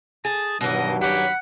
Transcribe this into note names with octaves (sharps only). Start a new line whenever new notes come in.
G#4 A5
G2 B2 D#3 E3 F#3 D#5
C#4 G4 F#5 B5